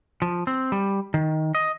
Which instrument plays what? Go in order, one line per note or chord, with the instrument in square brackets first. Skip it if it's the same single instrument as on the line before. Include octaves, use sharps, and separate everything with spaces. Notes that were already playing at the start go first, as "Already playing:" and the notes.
[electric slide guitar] F3
C4
G3
D#3
D#5